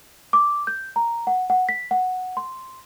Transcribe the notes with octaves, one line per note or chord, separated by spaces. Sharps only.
D6
G6
A#5
F#5
F#5
B6
F#5
C6